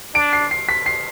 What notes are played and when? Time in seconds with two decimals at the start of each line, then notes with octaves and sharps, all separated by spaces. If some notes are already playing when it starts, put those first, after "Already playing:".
0.14 D4 D7
0.33 C7
0.51 C7
0.69 B6
0.86 C7